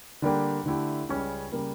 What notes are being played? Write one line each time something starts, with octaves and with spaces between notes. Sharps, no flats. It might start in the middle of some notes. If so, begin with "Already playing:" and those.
D3 G3 A#3 D4 G4
D3 A3 E4 G4
C#2 C#3 G3 C#4
C#3 G3 A#3